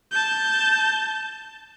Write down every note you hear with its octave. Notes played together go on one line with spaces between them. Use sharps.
A5 G6